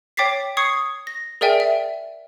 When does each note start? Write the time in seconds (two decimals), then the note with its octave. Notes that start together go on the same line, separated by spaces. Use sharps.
0.17 C#5 G5 D6 A6 B6 C7
0.57 C#6 D#6 G#6 C7 C#7
1.07 A#6
1.41 G#4 A#4 D5 E5 G5 G#5
1.60 E5